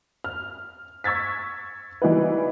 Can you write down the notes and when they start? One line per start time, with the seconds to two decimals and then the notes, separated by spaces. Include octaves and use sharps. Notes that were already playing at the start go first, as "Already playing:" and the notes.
0.24 F6
1.04 C#6 E6 G#6 A6 B6
2.02 E3 G3 D#4 E4 F#4 B4